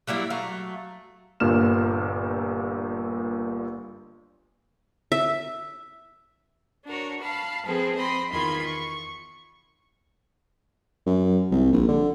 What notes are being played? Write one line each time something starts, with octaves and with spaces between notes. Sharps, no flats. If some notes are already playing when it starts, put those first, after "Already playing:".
F#3 G3 A#3 E4
F#3 A3 F5
G1 G2 A#2 A#3 F6 E7
E5
D4 F#4 A#4 C#5
F5 A5 B5 F6
F3 C4 G#4 A4 B4
C4 D#5 B5 C6
E2 D#3 F4 B5 C6 G#6
C#6
F#2
C2
A#1
D3